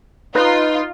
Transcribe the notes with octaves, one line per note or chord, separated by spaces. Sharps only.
D#4 F4 B4